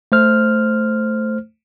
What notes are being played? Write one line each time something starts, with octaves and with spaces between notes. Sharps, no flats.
A3 C5 F6